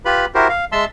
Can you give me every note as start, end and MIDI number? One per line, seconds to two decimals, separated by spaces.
0.05 0.26 65
0.05 0.26 67
0.05 0.26 71
0.05 0.26 83
0.35 0.48 64
0.35 0.48 66
0.35 0.48 67
0.35 0.48 70
0.35 0.48 72
0.49 0.65 77
0.72 0.85 56
0.72 0.85 76
0.72 0.85 81
0.72 0.85 84
0.72 0.85 88